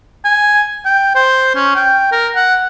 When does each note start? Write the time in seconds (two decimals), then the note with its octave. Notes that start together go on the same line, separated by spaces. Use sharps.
0.25 G#5
0.85 G5
1.15 C5
1.55 C#4
1.76 G5
2.12 A#4
2.35 F#5